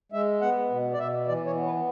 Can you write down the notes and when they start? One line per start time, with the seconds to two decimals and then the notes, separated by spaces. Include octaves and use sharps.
0.12 G#3 E5
0.41 B3 F#5
0.70 B2
0.93 D5
0.98 B2 E5
1.27 E3 D5
1.46 C#5
1.55 B3
1.65 B4